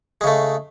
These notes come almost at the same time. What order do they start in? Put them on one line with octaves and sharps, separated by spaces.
G#3 C#3 A3